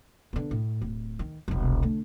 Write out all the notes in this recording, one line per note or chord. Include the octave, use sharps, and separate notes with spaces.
D3 B3
A2
D1
D#3
E1 C2
D3 A3